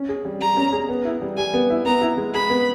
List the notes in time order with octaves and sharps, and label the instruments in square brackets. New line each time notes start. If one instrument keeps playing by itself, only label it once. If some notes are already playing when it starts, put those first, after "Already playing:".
Already playing: [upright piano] C#4
G#4
G3
[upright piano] G3 [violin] A#5
[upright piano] C#4
G#4
B3
E4
G3
[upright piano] G3 [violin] G#5
[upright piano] B3
E4
[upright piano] B3 [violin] A#5
[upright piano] E4
G#3
[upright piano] G#4 [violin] B5
[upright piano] B3